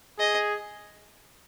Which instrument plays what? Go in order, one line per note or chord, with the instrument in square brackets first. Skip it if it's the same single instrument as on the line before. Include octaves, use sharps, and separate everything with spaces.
[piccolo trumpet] G#4 [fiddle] D#5